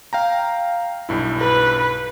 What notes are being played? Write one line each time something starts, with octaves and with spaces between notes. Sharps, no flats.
F5 G5 A#5
B1 G2 E4
B4